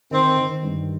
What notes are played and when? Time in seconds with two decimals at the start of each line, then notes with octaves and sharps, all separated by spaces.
0.11 D#3 C4
0.37 D#3
0.63 G2